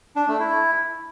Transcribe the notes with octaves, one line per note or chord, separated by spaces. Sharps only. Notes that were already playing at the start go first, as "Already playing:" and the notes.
D4
A3
E4